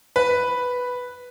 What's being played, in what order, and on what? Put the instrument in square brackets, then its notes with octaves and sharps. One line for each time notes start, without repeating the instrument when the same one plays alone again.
[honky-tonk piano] B4